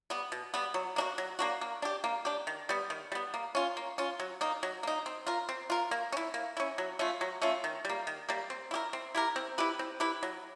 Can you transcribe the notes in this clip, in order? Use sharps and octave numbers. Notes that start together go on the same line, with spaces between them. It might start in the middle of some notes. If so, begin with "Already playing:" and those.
G3 B3
B2
G3 B3
F#3
A#3 D4 F#4
F#3
A#3 D4 F#4
A#3
D4 G4
A#3
D4 G4
D#3
G3 B3
D#3
G3 B3
A#3
C#4 F4
A#3
C#4 F4
F#3
A#3 D#4
F#3
A#3 D#4
C4
F4 A#4
C4
F4 A#4
A#3
C#4
E4
A#3
C#4 E4
F#3
A3 C#4 F4
F#3
A3 C#4 F4
D#3
G3 A#3
D#3
G3 A#3
C4
E4 G4 A#4
C4
E4 G4 A#4
C4
E4 G4 B4
C4
E4 G4 B4
F#3